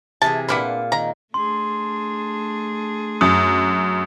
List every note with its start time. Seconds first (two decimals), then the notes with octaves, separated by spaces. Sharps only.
0.22 C3 E3 G#4 A5
0.49 A#2 B3 D4 F4 F#5 B5
0.92 D#3 A#5
1.34 A3 D4 G#4 C6
3.21 F#2 D#6